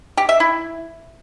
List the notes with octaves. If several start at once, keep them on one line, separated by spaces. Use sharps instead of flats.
G4
E5
E4